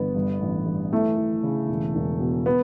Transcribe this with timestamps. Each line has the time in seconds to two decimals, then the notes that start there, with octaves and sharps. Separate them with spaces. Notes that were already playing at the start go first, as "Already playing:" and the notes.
Already playing: G1 B3
0.15 G2
0.40 A1
0.66 G2
0.93 E3 A3
1.17 E3
1.43 C#3
1.69 E1
1.95 E1
2.20 B2
2.46 B3